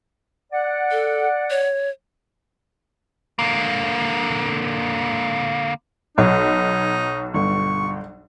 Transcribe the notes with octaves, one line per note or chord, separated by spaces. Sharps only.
D5 F#5
A4
C#5
D3 A#3
B1 D#4 C#5
G1 C#6